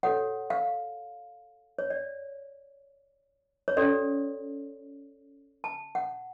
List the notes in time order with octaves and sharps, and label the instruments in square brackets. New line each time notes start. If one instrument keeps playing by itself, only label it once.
[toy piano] F#4 A4 C#5 F#5
F5
C#5
D5
C#5
C#4 F#4 A4 D5
A5
F#5